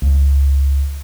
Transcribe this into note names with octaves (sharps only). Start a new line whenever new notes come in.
C#2